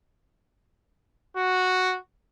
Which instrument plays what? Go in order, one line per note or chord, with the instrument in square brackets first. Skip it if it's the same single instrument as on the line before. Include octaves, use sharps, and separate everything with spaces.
[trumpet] F#4